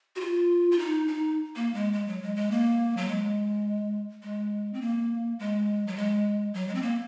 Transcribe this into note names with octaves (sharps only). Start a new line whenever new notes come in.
F#4
F4
F4
D#4
D#4
A#3
G#3
G#3
F#3
G#3
G#3
A#3
F#3
G#3
G#3
C4
A#3
G#3
F#3
G#3
F#3
G#3
C4
A#3